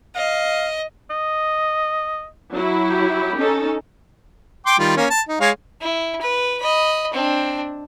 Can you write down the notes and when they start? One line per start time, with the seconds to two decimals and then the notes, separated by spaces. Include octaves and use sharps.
0.15 D#5 F5
1.10 D#5
2.53 F#3 E4
2.90 G4
3.38 C#4 D#4 A4
4.66 G5 C6 D6
4.79 D#3 G3 F4
4.97 A#3 C#4
5.10 A5
5.29 D#4
5.41 G#3 C#5 F5
5.81 E4
6.22 B4
6.59 D#5 B5
7.14 C4 D4